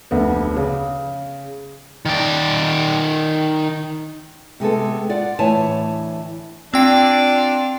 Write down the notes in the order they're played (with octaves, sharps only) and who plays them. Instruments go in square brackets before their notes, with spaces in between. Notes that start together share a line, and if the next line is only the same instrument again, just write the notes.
[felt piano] F1 D2 B3
C#3
[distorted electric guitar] D#3 D5
[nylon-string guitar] C3 G#3 B3 A4
F4 D5 F#5
D2 A2 E3 C#5 G#5 A5
[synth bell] C4 G5 C7 [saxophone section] D4 F4 D5